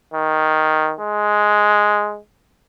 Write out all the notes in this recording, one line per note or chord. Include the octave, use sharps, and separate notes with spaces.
D#3
G#3